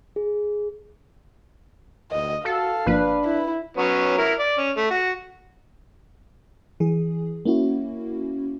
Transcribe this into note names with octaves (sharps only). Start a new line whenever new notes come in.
G#4
D2 D#5
F#4 A4 F5
G1 F3 A#3 D4 B4
E4 B5
F#3 B3 C#4
E4 A#4
D5
C#4
A3
F#4
E3 G#4
A#3 C#4 E4 F#4